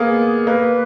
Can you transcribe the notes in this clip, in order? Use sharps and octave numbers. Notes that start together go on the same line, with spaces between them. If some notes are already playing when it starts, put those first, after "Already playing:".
Already playing: A#3 B3 G#4
A#3 B4